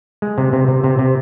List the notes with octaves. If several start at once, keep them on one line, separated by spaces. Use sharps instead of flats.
G#3
C3
C3
C3
C3
C3